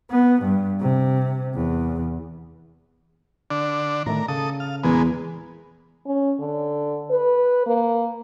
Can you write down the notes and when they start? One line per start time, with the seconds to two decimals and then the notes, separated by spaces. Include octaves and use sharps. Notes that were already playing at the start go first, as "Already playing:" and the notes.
0.10 B3
0.43 G2
0.81 C3
1.55 E2
3.51 D3 D4
4.06 A2 D#3 A3 A#4
4.28 C#3 A4 D#6
4.60 F5
4.84 E2 A#2 G#3 B3
6.06 C#4
6.39 D3
7.10 B4
7.66 A#3